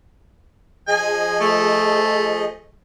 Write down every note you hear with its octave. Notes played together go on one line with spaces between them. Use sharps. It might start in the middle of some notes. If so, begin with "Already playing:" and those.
F3 G#4 D#5 G#5
A3